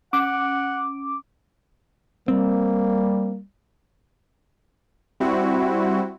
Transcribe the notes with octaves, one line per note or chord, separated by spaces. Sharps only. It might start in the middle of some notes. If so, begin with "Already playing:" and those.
C#4 F#5 D6
G3 A#3 C4
G3 C4 E4 F#4